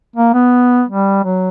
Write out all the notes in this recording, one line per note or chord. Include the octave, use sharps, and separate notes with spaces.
A#3
B3
G3
F#3